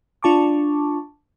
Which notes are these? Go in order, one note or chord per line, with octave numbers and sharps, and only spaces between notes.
D4 F4 A5 C#6 D6